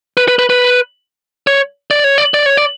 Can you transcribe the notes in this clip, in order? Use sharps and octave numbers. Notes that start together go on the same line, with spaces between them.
B4
B4
B4
B4
C#5
D5
C#5
D5
D5
C#5
D5